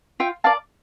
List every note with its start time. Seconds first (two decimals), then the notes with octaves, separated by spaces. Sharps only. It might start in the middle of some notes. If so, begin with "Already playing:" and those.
0.20 F4 E5 G5
0.44 A#4 D5 F5 A5